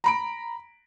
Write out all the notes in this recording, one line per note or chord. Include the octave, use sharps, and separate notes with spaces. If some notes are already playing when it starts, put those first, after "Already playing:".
A#5 B5 D7